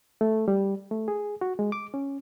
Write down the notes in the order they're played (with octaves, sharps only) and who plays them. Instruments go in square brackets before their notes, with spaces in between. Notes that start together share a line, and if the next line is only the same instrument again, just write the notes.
[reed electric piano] A3
G3
A3
G#4
F#4
G#3
D6
C#4